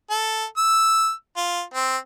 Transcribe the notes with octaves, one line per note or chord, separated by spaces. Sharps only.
A4
E6
F4
C4